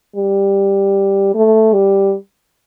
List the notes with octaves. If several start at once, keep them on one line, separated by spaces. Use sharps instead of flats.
G3
A3
G3